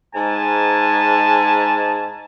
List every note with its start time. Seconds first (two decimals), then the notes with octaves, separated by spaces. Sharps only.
0.15 G#2 G#5 A5